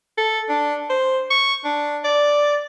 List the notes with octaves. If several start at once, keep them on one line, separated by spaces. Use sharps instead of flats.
A4
D4
C5
C#6
D4
D5